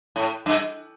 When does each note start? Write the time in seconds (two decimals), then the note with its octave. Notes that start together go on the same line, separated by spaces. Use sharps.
0.16 A2
0.46 G2